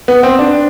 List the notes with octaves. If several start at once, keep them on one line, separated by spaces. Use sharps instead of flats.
B3
C4
D4